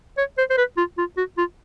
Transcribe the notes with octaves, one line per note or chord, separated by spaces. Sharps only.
C#5
C5
C5
B4
F4
F4
F#4
F4